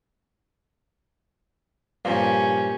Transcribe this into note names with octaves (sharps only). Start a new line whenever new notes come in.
G2 A#2 F3 C#4 G4